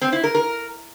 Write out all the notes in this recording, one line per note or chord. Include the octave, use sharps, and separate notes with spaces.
C4
E4
A#4
A#4